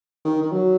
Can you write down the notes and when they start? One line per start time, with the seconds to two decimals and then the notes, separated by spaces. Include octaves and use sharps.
0.25 D#3
0.42 D#3
0.52 F#3